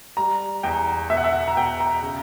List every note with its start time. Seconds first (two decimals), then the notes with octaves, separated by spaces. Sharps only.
0.17 G3 A#5
0.63 E2 G5
1.10 B2 E5
1.17 F#5
1.24 E5
1.33 F#5
1.48 A#5
1.56 B2 G5
1.80 A#5
2.03 C#3